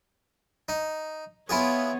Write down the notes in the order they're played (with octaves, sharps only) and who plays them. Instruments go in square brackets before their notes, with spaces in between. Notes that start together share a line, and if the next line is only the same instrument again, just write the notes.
[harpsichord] D#4
[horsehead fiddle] B3 C#5 [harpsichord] E4 F4 G#4